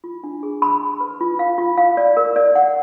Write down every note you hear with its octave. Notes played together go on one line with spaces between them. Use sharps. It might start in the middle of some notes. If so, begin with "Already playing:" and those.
F4
D4
G#4
B5
B5
B4
F4
F5
F4
F5
D5
A#4
D5
F#5